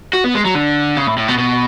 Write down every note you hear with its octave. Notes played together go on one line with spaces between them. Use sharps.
F#4
B3
G#3
F#3
D3
C#3
A2
A2
B2
B2